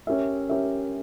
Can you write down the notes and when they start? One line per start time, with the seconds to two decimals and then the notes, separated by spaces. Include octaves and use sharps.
0.07 C#4 G4 A#4 E5
0.49 C#4 G4 A#4 E5